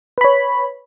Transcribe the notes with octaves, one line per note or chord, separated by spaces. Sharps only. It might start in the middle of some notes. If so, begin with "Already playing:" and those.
B4 C#5 B5